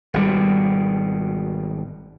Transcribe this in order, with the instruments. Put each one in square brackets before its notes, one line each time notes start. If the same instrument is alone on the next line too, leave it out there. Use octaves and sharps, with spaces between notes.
[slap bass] G#1 B2 G3